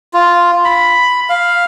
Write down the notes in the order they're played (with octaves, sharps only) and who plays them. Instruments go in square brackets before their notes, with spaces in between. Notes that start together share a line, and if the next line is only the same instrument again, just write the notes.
[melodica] F4
B5
F5